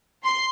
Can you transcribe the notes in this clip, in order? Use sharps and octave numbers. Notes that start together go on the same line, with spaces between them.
C6